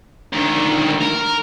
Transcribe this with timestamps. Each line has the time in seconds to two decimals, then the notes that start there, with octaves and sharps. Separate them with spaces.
0.33 D2 D#3
1.01 A#4